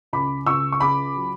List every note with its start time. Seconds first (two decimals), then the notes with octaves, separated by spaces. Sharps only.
0.13 C#2 B5 D6
0.46 C#2 C#6 E6
0.72 C#6
0.81 C#3 B5 D6
1.16 F#3